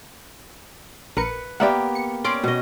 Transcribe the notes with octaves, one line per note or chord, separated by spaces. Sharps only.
A#1 A#4 B4 C#7
A#3 B3 G4 D5 E5 F#5
C#7
C#4 D5 C6 D7
B2 D#5